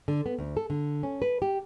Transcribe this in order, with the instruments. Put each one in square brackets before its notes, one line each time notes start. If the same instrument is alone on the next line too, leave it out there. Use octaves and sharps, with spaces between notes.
[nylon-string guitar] D3
B3
D2
A4
D3
C#4
B4
G4